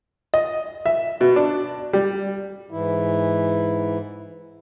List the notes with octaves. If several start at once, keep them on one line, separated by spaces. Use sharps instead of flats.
D#5
E5
B2
D4
G3
G#2 E3 E4